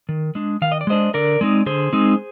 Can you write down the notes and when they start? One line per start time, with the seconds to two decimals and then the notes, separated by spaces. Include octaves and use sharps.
0.09 D#3
0.35 G#3 D4
0.62 D#3 F5
0.72 D#5
0.81 D5
0.87 G#3 D4 C5 D#5
1.14 D3 A#4 D5
1.41 G#3 C4 D#4
1.66 D3 G#4 C5
1.93 G#3 C4 D#4